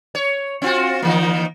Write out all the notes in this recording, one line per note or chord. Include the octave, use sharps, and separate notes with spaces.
C#5
C4 F4 F#4
D#3 E3 A#3